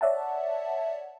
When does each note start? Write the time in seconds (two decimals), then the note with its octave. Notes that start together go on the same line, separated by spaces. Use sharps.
0.01 C#5 D5 E5 F#5 A5